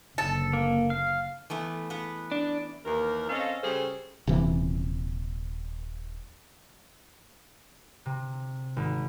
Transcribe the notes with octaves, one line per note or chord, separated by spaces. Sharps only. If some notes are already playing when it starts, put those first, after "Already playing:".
F#1 D3 A4
A#3
F5
E3 A3 B3
B3 B4 F#5
D4
D#2 E3 A#4
C4 C#4 A4 D#5 F5
C#3 G3 C#4 G#4 A4 C5
D#1 C3 E3
C3
G#1